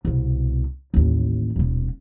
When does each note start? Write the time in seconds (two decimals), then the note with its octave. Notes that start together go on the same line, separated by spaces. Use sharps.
0.05 C2 B2
0.94 A1 D#2
1.56 D#1 B2